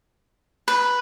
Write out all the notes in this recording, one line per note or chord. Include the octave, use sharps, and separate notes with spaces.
B4